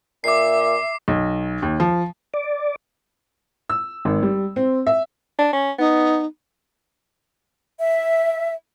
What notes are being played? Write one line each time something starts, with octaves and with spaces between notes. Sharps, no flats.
A#2 E5 D6 C7
B1
D#2
F3
D5
E6
G#1
G3
C4
E5
D4
C#4
B3 D#4
E5